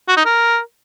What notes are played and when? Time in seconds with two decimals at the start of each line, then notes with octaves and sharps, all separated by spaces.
0.08 F#4
0.17 D#4
0.25 A#4